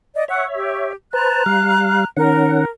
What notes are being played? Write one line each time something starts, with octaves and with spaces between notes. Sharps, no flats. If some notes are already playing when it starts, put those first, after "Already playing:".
D5 D#5
C#5 E5 F#5
G4
B4 C5 A5 A#5 F#6
G3 F5
D#3 C#4 A#4 F#5